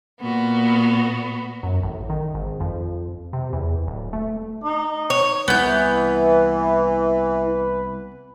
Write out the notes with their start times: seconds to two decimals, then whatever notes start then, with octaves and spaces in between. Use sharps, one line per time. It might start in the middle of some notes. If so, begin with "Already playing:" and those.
0.20 A#2 B3 F#4
1.63 F#2
1.83 A1
2.10 D#3
2.34 G#1
2.60 F2
3.33 C3
3.53 E2
3.87 D1
4.13 A3
4.64 D#4
5.10 C#5
5.48 C2 E3 B3 B4 G6